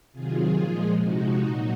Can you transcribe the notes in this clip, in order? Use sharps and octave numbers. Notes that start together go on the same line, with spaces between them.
C3 D#3 F#3 F4 G#4
A#2 F3 G#3
C3 F3 G#3 D#4 F#4
A#2 F#3